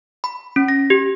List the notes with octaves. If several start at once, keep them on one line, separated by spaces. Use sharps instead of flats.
B5
C#4
A#6
G4